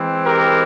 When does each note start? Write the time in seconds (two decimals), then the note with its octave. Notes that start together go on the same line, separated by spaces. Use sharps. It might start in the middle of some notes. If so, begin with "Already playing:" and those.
Already playing: E3 G#3 C4
0.25 G4 A#4